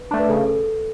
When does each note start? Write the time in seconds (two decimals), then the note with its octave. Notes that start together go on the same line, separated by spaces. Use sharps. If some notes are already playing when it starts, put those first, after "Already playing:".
Already playing: B4
0.11 A3 D4
0.19 B4
0.29 C#3 A4
0.47 A4